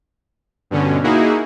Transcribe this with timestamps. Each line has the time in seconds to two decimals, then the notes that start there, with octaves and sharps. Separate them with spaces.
0.71 G2 B2 D3 C#4
1.04 A#3 D#4 E4 F#4 G#4